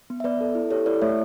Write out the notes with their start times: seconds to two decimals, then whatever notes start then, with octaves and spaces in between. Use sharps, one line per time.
0.10 B3
0.20 E5
0.24 B3 B4 D5
0.41 A4
0.55 E4
0.71 G4 A4 C#5
0.86 E4 B4 D5
1.01 A3 C#5 E5